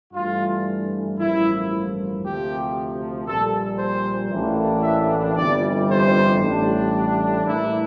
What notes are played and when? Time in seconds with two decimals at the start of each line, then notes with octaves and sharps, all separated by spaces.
0.13 G2 E3 A3 D4 F4
1.18 A1 G2 F3 A#3 E4
2.22 D2 C3 F3 G4
3.27 A#1 A#2 G3 A4
3.79 C5
4.31 A1 A2 E3 A#3 D4
4.83 E5
5.35 G1 F2 E3 G3 D5
5.88 C5
6.39 A1 A2 G3 D4
7.44 A2 E3 G3 A#3 D4 E4